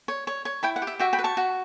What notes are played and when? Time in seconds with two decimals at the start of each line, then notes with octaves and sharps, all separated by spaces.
0.08 C#5
0.27 C#5
0.45 C#5
0.63 E4 G5 B5
0.76 F#5
0.82 G4
0.87 E5
0.99 F#4 E5 G5
1.13 G5 B5
1.19 B4
1.24 A5 C#6
1.37 F#4